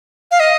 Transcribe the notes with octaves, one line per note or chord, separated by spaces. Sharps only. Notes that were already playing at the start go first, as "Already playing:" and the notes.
F5
D#5